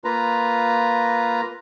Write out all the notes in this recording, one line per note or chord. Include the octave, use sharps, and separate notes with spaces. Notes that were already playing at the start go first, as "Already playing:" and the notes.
A#3 F4 B4 A#5